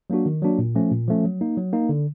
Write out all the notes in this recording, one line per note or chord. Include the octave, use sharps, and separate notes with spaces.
F#3 A#3 D4 F#4
D#3
F#3 A#3 D4 F#4
A#2
F3 A3 C#4
A#2
F3 A3 C#4
F#3
A#3 D#4
F#3
A#3 D#4
D3